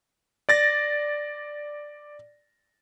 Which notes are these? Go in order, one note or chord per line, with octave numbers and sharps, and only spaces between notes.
D5 A6 A#6